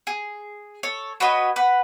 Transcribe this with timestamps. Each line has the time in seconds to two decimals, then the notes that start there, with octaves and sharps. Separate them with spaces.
0.07 G#4
0.83 A4 C#5
1.20 F#4 B4 C#5 D#5
1.56 B4 F#5